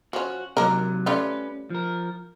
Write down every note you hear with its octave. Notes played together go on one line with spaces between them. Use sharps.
F3 C#4 F#4
C3 D#3 F#3 A#3 A#4
G3 A3 C#4 F4 B4
F3 A#4